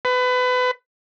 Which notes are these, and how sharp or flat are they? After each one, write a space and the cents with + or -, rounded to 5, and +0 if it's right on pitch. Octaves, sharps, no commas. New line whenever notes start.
B4 +25